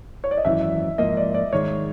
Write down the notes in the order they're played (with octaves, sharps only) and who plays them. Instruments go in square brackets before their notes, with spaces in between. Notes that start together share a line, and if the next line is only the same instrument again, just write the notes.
[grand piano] C#5
D5
D#5
[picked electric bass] G#1 F#2 C#3 E3 [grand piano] E5
[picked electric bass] G#2 F3 A#3 [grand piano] D#5
[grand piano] D5
D5
[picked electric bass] G#2 D#3 G#3 [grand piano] C#5